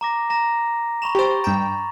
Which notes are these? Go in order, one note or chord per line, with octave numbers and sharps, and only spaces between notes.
A#5 D6 A#6
A#5 A#6
B5 C#6 E7 F7
G4 C5 C#6 A6
G2 G5 A#5